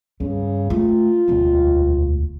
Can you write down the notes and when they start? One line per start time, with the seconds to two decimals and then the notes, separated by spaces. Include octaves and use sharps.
0.20 G2 C#3
0.70 A3 F4
1.28 E1 D2